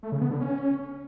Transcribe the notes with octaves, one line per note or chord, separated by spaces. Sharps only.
A3
C#3
B3
D3
C#4